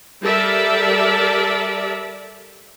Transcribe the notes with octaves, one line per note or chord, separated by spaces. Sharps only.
G3 A4 A#4 D5 E5